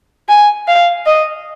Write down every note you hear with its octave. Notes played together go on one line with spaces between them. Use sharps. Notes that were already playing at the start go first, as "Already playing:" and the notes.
G#5
F5
D#5